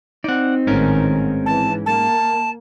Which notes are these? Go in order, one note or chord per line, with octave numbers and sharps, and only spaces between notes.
C4 D#4 D5 F#5
A1 G#2 D#3 C#4 A#4
E3 A5
A#3 A5